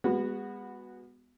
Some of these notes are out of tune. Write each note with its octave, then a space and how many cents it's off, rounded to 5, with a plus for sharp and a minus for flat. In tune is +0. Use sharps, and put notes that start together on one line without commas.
G#3 -40 B3 +0 F#4 -5